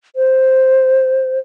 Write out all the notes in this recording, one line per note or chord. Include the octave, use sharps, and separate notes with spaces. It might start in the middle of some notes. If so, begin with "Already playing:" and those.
C5